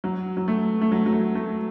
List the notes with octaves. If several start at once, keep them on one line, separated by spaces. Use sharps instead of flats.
F#3
F#3
A3
A3
F#3
F#3
A3
A3